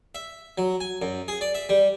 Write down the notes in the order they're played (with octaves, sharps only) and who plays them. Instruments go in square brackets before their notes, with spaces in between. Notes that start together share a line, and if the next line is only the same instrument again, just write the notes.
[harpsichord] E5
F#3
G#5
F#2
G#4
D5
E5
G3